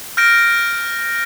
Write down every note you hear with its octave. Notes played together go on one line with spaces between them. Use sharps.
F6 G6 A#6 D7